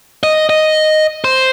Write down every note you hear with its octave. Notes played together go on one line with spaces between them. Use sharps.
D#5
D#5
C5